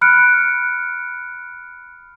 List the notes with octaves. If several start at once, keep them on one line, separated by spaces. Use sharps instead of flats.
B5 F6 F#6 C#7 D7